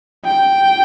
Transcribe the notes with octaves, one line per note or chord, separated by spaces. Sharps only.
G5